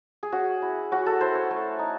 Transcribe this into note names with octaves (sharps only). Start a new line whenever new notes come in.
G#4
C#4 F#4
E4
C#4 F#4
A4
E4 C5
C#5
A3
D#4